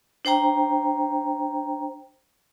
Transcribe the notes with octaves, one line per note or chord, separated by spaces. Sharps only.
D4 C5 G5 A#5